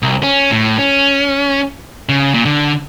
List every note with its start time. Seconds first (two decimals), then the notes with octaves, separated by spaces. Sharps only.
0.03 C2
0.23 C#4
0.51 A2
0.79 C#4
2.09 C#3
2.34 A#2
2.45 D3